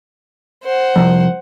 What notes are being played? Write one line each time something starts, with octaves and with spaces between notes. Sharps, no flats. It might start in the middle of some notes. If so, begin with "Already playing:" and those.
C5 F#5
C2 F2